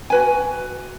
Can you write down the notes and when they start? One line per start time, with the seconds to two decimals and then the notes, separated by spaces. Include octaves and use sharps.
0.10 F#4 B4 G#5